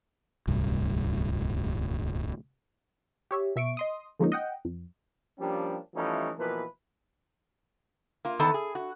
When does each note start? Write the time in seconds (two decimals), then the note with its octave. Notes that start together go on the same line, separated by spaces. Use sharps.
0.48 D1 C2 G2
3.31 G4 C#5 E5
3.56 B2 E5 C#6 D7
3.77 D#5 C6 D#6
4.20 D3 F3 G#3 A#3 C#4 D#4
4.32 D#5 F#5 G5
4.65 F2
5.39 F3 G3 A#3 C#4 D4 G4
5.95 E3 F3 G3 A3 C#4 D#4
6.38 B2 E3 F3 A#3 B4
8.25 A#3 F4
8.39 E2 D#3 B3 A4
8.54 G#4
8.75 F#4